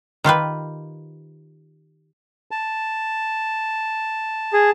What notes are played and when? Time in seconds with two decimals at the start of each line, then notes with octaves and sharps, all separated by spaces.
0.24 D#3 F4 G4 B4
2.51 A5
4.53 G#4